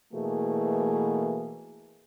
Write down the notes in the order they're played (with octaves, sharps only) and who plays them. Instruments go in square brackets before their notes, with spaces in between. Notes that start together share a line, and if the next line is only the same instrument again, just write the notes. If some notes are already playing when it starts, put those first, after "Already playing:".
[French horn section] B2 E3 A3 A#3 F#4 G#4